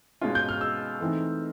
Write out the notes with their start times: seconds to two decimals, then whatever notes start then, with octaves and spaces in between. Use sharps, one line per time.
0.21 B2 G#3 C#4 F4
0.35 G6
0.49 F6
0.61 E6
1.00 E3 A3 C4 D#4